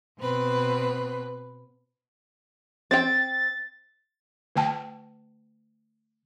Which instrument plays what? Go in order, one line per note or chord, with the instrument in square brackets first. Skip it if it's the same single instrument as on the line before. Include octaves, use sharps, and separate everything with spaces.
[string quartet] B2 C4 B4
[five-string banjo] C4 G5 [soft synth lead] A6
[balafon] D3 A3 G5 A5